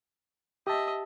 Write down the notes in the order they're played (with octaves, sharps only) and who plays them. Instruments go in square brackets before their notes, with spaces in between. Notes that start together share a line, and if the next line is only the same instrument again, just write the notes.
[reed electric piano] G4 A5 [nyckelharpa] D#5 E5